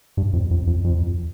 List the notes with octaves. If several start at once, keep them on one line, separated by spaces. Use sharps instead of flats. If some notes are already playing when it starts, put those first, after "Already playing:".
G2
F2
F2
F2
F2